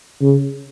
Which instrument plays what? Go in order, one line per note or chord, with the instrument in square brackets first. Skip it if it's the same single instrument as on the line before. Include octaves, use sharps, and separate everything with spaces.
[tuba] C#3